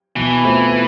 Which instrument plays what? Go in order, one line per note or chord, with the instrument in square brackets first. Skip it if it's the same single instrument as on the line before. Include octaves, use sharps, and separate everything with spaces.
[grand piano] B2 [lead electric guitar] E3
[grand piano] A3 C4 F4